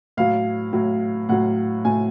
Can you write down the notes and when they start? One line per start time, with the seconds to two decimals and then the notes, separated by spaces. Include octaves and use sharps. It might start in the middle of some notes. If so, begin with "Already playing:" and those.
0.17 A2 F#3 F5
0.73 A2 F#3
1.29 A2 F#3 F#5
1.85 A2 F#3 G#5